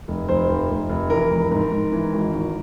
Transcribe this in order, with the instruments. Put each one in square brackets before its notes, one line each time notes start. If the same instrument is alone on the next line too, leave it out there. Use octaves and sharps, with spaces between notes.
[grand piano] F1
F1 C5
F1
F1
F1
E3 A#4
F1
G#2
G#2
E3
G#1
G#1